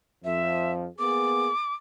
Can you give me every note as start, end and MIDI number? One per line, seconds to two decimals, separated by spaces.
0.25 0.87 41
0.25 0.87 53
0.25 0.72 76
0.99 1.49 58
0.99 1.49 59
0.99 1.49 68
0.99 1.74 86